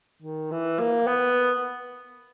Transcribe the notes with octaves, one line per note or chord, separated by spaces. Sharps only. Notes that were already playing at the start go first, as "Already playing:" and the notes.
D#3
E3
A#3
B3